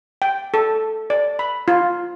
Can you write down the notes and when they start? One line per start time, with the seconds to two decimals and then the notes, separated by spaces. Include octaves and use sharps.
0.22 G5
0.54 A4
1.10 D5
1.39 B5
1.68 F4